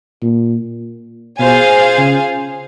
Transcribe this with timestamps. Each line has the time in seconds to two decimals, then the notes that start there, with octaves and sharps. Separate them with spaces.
0.22 A#2
1.39 B2 F4 G#4 C5 F5 G#5
1.98 C#3